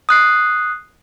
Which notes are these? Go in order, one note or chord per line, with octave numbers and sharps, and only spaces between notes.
D#6 F#6 C7